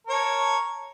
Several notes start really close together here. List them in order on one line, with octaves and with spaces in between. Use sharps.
A#4 C#5 A5